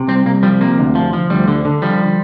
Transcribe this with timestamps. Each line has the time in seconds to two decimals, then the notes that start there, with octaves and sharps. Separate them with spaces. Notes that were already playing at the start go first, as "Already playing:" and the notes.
Already playing: C3
0.08 C2 C4
0.26 C2 A#3
0.43 F3 G3
0.61 C3 A#3
0.78 D2
0.95 F3
1.13 F3
1.30 D2 G3
1.48 D3
1.65 D3
1.82 F3 G3